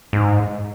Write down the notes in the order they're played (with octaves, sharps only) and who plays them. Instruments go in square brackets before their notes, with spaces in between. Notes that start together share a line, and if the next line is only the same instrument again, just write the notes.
[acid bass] G#2